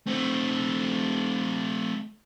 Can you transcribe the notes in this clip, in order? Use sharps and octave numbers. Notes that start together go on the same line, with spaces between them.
A3 C4